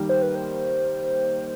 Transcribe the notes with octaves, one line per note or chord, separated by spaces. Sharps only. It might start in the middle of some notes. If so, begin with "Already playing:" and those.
Already playing: D#3 G3 A#3
C5
B4
C5